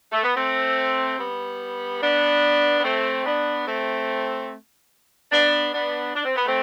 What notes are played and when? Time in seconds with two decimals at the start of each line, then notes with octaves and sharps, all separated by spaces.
0.11 A3
0.23 B3
0.36 A3 C4
1.18 G3 B3
2.01 B3 D4
2.79 B3
2.84 A3 C4
3.25 B3 D4
3.67 A3 C4
5.32 B3 D4
5.72 B3 D4
6.14 D4
6.25 C4
6.36 B3
6.46 A3 C4